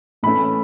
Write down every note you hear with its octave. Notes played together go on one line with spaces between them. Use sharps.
A2 E3 A3 C#4 B5